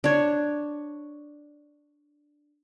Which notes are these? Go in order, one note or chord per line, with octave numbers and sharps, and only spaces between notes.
D4 C#5